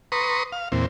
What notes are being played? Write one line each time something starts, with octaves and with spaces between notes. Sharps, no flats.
B4 A#5 C6 C#6 D#6
F5
E2 A#2 C4